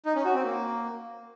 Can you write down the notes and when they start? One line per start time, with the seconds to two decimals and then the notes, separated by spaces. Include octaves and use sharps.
0.05 D#4
0.15 C#4
0.25 F#4
0.35 C4
0.44 A#3